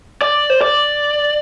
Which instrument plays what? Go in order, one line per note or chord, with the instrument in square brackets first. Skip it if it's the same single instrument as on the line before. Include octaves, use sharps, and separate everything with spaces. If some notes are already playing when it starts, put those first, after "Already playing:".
[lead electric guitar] D5
C5
D5